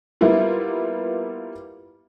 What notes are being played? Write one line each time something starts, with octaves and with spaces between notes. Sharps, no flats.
G3 A#3 B3 E4 F4